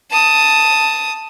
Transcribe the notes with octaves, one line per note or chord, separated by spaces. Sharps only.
A5 D#6